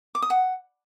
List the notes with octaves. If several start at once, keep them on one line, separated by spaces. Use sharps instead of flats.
D6
D#6
F#5